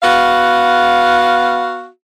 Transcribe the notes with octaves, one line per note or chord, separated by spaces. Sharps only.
B3 F#4 F5